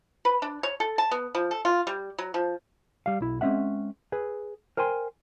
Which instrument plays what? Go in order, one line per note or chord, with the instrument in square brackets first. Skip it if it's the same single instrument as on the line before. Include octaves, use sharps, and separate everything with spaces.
[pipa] B4
D4
C#5
A4
A5
B3
F3
A4
F4
G3
F#3
F3
[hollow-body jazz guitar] G3 F5
B1 E4
G#3 C4 C#4 E5 F#5
G#4 B4
A#4 C5 G5 G#5 C6